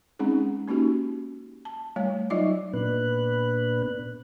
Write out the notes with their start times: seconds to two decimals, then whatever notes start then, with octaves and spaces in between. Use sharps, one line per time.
0.19 G#3 C4 C#4 D#4 G#4
0.68 A#3 C#4 D#4 F#4 G4
1.65 A5
1.96 G3 A3 C#5
2.30 F#3 D#4 F4 D5 D#5 D6
2.73 A#2 B3 D4 B4 F#6